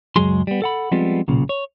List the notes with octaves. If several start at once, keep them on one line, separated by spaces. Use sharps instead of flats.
C#2 F#2 F#3 G#3 G#4 C6
G3 B3
A4 F#5 B5
F3 G3 G#3 B3 C4 F4
B1 A#2 C#3
C#5